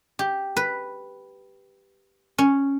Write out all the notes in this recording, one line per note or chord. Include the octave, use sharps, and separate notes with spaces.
G4
B4
C#4